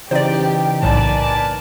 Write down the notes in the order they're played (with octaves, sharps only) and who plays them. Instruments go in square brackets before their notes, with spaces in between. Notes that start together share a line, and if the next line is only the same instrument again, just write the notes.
[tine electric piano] C#3 E3 D#4 [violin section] G4 [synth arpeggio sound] C5 D5
[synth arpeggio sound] B1 A2 [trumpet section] A#3 B4 A5 [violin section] D5 G#5